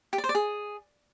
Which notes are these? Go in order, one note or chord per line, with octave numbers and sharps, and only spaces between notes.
G4
D5
C5
D5
G#4